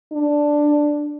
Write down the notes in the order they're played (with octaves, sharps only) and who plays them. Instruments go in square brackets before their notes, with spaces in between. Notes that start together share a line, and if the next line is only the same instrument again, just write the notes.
[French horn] D4